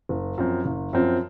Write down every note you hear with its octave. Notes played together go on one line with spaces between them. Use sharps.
F#1
F#2 F3 C4
F#1
F#2 F3 C4